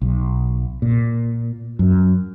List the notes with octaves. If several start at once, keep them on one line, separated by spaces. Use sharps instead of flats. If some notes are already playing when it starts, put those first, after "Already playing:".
B1
A#2
F#2